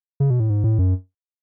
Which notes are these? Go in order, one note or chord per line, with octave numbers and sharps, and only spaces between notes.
C#3
B2
A2
G#2
A2
F#2